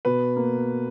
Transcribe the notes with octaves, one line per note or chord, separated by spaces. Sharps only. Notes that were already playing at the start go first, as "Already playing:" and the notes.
B2 B4
A#3